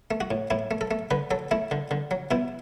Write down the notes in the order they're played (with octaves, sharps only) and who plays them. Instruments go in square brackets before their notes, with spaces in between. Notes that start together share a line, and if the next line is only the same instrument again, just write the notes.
[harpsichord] A3
F#4
A2
A2 E4
A3
A4
A3
D3 B4
F#3 A4
A3 E4
D3
D3
F#3
B2 E4